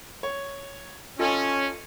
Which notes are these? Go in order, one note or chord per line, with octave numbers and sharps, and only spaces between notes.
C#5
C#4 F4 A4 D#5